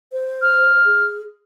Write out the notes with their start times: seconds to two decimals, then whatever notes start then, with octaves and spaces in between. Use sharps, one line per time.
0.12 C5
0.42 F6
0.85 G#4